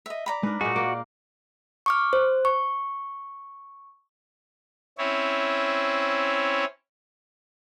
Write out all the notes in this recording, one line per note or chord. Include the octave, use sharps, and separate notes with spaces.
D#5 E5
D5 A#5 B5
G#3 D4 D#4 A#4 B4
A#2 G#3 F#4 G#5
A#3 D5
C#6 D6 F6
C5
C#6
C4 C#4 E4 C#5